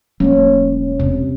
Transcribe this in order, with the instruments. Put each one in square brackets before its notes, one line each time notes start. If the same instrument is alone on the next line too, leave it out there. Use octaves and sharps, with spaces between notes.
[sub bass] E1 [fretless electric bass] F#3 A3 A#3 [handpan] C#4
[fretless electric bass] E2 [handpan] C3